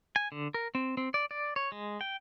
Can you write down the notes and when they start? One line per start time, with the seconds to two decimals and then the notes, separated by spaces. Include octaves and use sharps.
0.16 G#5
0.32 D3
0.54 A#4
0.75 C4
0.97 C4
1.14 D5
1.31 D5
1.56 C#5
1.72 G#3
2.01 G5